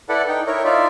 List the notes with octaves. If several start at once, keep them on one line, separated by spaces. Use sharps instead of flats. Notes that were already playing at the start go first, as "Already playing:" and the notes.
E4 A4 B4 D5 F#5
D#4 G5
E4 A#4 C#5
D#4 F4 D5 E5